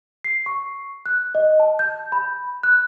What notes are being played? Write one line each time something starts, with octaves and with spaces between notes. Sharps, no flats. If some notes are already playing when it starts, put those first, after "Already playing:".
C7
C#6
F#6
D#5
A5
G6
B5
F#6